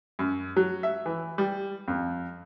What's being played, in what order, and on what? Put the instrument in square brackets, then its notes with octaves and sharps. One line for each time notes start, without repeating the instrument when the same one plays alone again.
[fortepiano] F#2
F#3
E5
E3
G3
F2